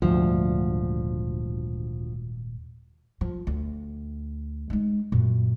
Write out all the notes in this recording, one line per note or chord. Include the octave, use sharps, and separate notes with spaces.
D#1 D2 G#2 F3 G3
F3
D2
G#3 D#4
F#2 A#2